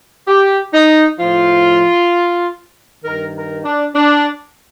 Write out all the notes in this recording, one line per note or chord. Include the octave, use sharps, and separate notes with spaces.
G4
D#4
A2 F3 F4
G2 D#3 A#4
A#4
D4
D4